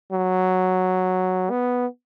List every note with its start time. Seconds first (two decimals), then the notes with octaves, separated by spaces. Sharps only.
0.12 F#3
1.50 B3